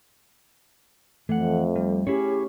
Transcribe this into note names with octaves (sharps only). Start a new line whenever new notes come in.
F2 E3 A3 F#5
G3
C#4 E4 G4 G#4 C#5